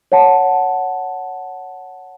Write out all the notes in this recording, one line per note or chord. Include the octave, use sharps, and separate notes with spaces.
C#5 F#5 A5